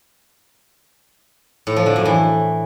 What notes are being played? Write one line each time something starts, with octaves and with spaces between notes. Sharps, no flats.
A2
F3
D3
F#2
E3